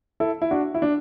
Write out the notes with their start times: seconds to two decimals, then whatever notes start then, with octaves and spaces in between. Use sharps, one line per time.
0.20 E4 A4
0.42 E4
0.51 D4 F#4
0.74 E4
0.82 D4